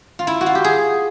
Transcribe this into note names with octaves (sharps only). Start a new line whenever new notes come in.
F4
E4
F#4
F4
G4
G#4